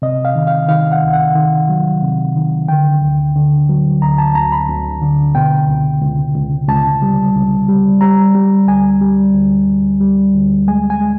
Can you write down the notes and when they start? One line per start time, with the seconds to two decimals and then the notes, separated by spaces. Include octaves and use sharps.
0.02 C3 D#5
0.25 F5
0.35 D#3
0.47 F5
0.68 D#3 F5
0.92 F#5
1.03 C#2
1.13 F#5
1.35 D#3
1.69 F#3
2.03 C3
2.35 D#3
2.68 D3 G5
3.02 D2
3.35 D3
3.69 F#3
4.02 D2 A#5
4.18 A5
4.35 D2 A#5
4.52 B5
4.69 D2
5.02 D3
5.35 B2 G5
5.68 C#2
6.02 C#2
6.35 C#2
6.68 C#2 A5
7.02 G3
7.35 C#2
7.69 G3
8.01 G3 A#5
8.35 G3
8.67 D2 G#5
9.01 G3
9.35 D2
9.68 D2
10.00 G3
10.35 D2
10.67 G#3 G#5
10.90 G#5
11.01 G#3